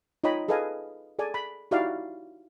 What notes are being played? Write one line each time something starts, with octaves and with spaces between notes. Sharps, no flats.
D#4 F4 C#5 D#5 G5 B5
G#4 A4 B4 D#5 F5 G#5
G#4 A4 D5 G#5
B5
D#4 E4 F#4 G4 D5 F5